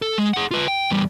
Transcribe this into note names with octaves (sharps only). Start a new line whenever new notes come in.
A4
G#3
G#4 F#5
F4 B4
G5
E2 G3